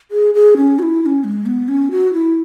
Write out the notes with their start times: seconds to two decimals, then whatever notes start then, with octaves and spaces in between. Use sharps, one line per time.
0.11 G#4
0.34 G#4
0.57 C#4
0.79 F#4
0.82 E4
1.02 E4
1.06 C#4
1.24 G#3
1.46 B3
1.68 C#4
1.91 F#4
2.13 E4